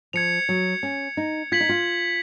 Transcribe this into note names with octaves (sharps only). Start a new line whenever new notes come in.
F3 G#6 C#7 F7
F#3
C#4
D#4
F4 G#6 B6 F#7
D#4
F4